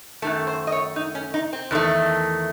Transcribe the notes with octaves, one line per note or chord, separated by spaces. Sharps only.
F#2 D#3 A3 A4
C5
D#5
C#5
D#4
C#4
D#4
C4
E2 D#3 A3